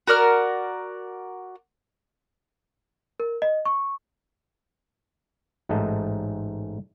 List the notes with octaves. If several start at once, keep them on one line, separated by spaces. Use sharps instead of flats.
F#4 A#4 D5 F6
A#4
D#5
C#6
A1 G#2 A3 D#4 D#5 A5